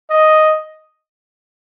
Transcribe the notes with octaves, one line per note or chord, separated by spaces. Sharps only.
D#5